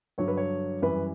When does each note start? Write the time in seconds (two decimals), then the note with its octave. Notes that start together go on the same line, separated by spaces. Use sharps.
0.18 G2 D3 F#3 C#5
0.28 B4
0.37 C#5
0.82 F#2 E3 G3 B4